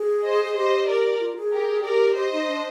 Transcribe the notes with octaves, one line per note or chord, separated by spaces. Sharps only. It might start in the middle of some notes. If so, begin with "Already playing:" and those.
Already playing: G#4
C5 D#5
G#4
G4 C5 D#5
A#4 D5
F4
G#4
G4 A#4
G4 G#4 A#4 D5
G4 C5 D#5
D#4
D4